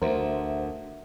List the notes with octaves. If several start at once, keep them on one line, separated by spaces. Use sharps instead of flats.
D2 A#4 C5 E5 F#5